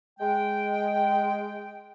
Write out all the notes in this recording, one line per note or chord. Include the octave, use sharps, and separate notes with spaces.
G#3 G5